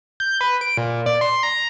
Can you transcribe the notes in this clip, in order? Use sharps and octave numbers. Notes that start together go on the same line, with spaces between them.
G6
B4
D7
A#2
D5
C6
A#5